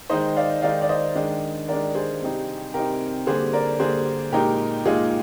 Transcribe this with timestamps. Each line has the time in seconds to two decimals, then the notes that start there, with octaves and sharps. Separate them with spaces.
0.10 D#3 G#3 D#4 C5 D#5
0.36 D5 F5
0.62 D#3 G#3 D#4 D5 F5
0.82 D5
0.89 C5 D#5
1.15 D#3 G#3 D4
1.68 D#3 G#3 D4 A#4 D5
1.95 G#4 C5
2.21 C3 G3 C4 D#4
2.74 C3 G3 C4 D#4 G4 A#4
3.27 D3 G3 A#3 G#4 C5
3.53 A#4 D5
3.80 D3 G3 A#3 G#4 C5
4.32 A#2 G#3 D#4 G4 A#4
4.85 A#2 G#3 D#4 F4 G#4